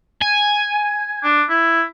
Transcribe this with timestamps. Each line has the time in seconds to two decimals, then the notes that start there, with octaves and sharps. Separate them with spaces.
0.21 G#5
1.24 D4
1.49 E4